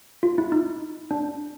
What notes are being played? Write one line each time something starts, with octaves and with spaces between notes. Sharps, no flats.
F4
E4
D#4
D4